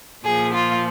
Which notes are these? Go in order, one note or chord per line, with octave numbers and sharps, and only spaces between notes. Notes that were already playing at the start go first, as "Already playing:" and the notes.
A#2 F3 G#4
F4